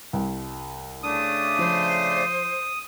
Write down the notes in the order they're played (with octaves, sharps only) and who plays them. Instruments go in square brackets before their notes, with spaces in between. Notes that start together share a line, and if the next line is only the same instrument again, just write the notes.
[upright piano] C2
[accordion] C#3 A3 D4 [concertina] D#6
[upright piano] F3 [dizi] C5